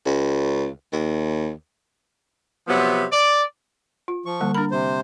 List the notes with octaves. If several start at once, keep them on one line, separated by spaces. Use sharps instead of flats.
C#2
D#2
C3 F3 F#3 B3
D5
F4
F3 C#6
D3 G3 A#3
D4 A#4 B5
C3 C5